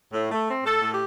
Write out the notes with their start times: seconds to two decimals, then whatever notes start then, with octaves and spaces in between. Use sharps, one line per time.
0.13 A2
0.31 A3
0.48 C4
0.64 A2 A4
0.81 A2
0.90 G4